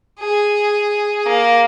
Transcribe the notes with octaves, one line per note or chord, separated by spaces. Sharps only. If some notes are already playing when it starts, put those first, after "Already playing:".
G#4
A#3